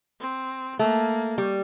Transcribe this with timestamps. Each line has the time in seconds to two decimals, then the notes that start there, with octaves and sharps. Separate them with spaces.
0.21 C4
0.79 A3 A#3
1.38 G3